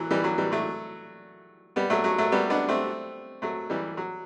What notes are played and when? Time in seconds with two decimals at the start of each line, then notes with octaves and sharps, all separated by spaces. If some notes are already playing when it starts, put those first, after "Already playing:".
Already playing: E3 F#3
0.11 E3 G3
0.24 F#3
0.38 E3 G3
0.52 F#3 A3
1.76 G3 B3
1.90 F#3 A3
2.04 F#3 A3
2.18 F#3 A3
2.32 G3 B3
2.50 B3 D4
2.69 A3 C4
3.42 F#3 A3
3.70 E3 G3
3.97 F#3